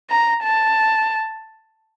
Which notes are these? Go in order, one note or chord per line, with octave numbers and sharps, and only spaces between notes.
A#5
A5